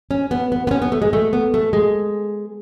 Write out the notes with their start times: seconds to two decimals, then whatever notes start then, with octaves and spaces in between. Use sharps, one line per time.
0.11 C#4
0.31 B3
0.52 B3
0.67 B3
0.71 C#4
0.82 B3
0.92 A3
1.02 G#3
1.13 A3
1.33 B3
1.54 A3
1.73 G#3